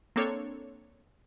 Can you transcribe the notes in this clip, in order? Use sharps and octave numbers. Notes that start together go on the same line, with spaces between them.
A#3 C4 D4 A4 C#5